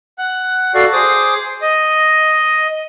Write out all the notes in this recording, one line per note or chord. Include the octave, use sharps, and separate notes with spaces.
F#5 F#6
F#4 A4 D5 F5
G#4 C5 D6 D#6
D#5